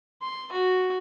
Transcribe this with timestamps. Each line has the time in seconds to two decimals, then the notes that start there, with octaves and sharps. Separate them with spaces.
0.22 C6
0.52 F#4